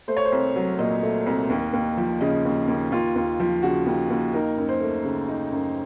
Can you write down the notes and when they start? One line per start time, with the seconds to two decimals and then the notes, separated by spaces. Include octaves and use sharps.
0.08 A3 C5
0.17 C#5
0.25 C5
0.32 C2
0.56 F#3
0.79 A#2 D#5
1.03 A3
1.26 C2
1.50 D#2
1.73 D#2
1.97 F3
2.21 C#3 D#5
2.45 D#2
2.68 D#2
2.92 D#2 F4
3.16 D#2
3.40 F3
3.62 C#3 F#4
3.86 D#2
4.10 D#2
4.33 D#4 A#4
4.58 F#2
4.69 C5
4.81 A3
5.05 C#3
5.28 D#4
5.52 F#2